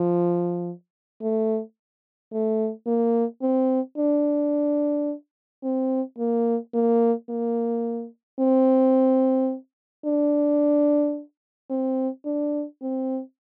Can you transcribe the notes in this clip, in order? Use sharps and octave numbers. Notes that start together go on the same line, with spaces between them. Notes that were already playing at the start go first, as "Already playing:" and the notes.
Already playing: F3
A3
A3
A#3
C4
D4
C4
A#3
A#3
A#3
C4
D4
C4
D4
C4